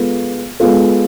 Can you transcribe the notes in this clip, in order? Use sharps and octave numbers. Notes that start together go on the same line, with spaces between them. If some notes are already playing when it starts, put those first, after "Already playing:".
Already playing: G#3 B3 F4 A4
G#3 B3 F4 A4